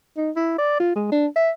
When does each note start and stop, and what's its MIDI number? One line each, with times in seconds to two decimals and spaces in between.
0.17 0.31 63
0.36 0.58 64
0.58 0.75 74
0.80 0.94 65
0.96 1.09 56
1.12 1.27 62
1.36 1.51 76